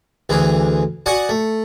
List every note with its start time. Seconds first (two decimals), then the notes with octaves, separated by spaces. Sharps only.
0.29 D2 E3 G#4
1.06 F#4 D5 F#5 G#5 D#6
1.29 A3